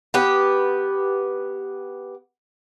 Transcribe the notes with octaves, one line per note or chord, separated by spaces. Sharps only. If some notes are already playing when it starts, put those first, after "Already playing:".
B3 G4